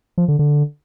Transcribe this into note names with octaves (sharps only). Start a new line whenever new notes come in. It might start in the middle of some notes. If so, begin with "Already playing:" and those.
F3
D3
D3